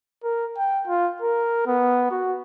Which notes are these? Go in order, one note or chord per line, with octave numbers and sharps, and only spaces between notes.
A#4
G5
F4
A#4
B3
F#4